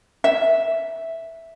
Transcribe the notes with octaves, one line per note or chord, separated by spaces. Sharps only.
E5